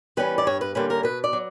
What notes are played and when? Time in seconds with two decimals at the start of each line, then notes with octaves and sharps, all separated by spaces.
0.17 E3 G3 C#4 B4
0.38 D5
0.47 G2 C#5
0.61 B4
0.75 D3 G3 A#3 C#4 B4
0.90 A#4
1.03 B2 B4
1.24 D5
1.33 F#3